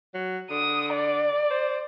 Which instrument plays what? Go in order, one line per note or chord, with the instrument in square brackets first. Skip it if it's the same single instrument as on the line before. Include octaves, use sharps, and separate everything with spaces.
[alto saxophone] F#3
[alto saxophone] D3 [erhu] D#6
[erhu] D5
[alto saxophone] C5